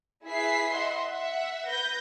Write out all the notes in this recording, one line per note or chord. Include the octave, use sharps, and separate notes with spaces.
E4 G#4 B4 E5 B6 C7
D#5 E5 F#5 C6
E5 F#5
B4 G6 A#6